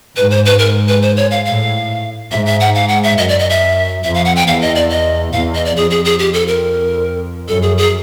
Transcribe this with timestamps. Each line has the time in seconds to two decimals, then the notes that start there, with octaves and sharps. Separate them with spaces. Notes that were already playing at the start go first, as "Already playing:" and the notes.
0.16 G#2 B4
0.31 C5
0.45 B4
0.59 A#4
0.88 B4
1.02 C5
1.17 C#5
1.31 F5
1.45 A2 F5
2.32 G#2 E5
2.46 E5
2.60 F#5
2.75 F5
2.89 F#5
3.03 E5
3.18 F#2 D#5
3.29 D5
3.39 D#5
3.50 E5
4.04 F2 E5
4.14 F5
4.25 F#5
4.36 G5
4.47 E2 F5
4.62 D#5
4.75 D5
4.90 D#5
5.33 E2 F5
5.55 D#5
5.65 D5
5.76 F2 G#4
5.91 G#4
6.05 G#4
6.19 G4
6.34 A4
6.48 A#4
7.48 F#2 A4
7.63 G#4
7.78 G#4